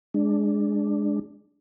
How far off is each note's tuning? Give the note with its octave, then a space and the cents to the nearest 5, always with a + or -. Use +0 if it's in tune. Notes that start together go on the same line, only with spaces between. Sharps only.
G#3 +0 D4 +0